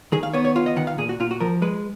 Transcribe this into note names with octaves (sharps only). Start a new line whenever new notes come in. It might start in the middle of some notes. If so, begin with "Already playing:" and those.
D#3 G#4
F5
B3 C#5
C#5
F4 F5
D#5
D#3 F#5
F5
A#2 G#4
F#4
A#2 F4
F#4
F3 A#4
G#3 B4